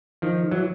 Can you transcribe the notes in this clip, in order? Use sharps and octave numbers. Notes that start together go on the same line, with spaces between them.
D#3 F3
E3 F#3